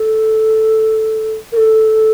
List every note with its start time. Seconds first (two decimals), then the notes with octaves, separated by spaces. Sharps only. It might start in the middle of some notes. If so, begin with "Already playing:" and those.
Already playing: A4
1.52 A#4
1.56 A4